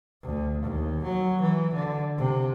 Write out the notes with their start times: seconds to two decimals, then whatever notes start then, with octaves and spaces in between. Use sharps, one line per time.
0.23 D2
0.62 D#2
1.03 F#3
1.41 E3
1.74 D3
2.18 C3